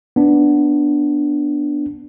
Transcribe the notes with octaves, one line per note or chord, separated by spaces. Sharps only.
B3 D4